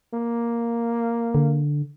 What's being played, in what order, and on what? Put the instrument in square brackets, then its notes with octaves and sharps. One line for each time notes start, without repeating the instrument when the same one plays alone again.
[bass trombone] A#3
[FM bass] D3